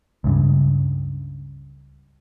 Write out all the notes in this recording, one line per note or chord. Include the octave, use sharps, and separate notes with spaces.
C#2 G2 C#3